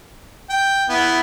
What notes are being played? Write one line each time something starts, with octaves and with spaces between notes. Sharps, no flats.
G5
B3 E4